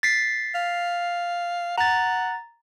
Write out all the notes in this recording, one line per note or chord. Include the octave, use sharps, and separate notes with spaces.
A6 B6 C7
F5
F#5 A#5 A6